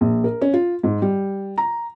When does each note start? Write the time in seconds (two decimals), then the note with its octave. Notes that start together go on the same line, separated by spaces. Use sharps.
0.01 A#1
0.24 A#4
0.42 C#4
0.54 F4
0.83 G#2
1.02 G3
1.58 A#5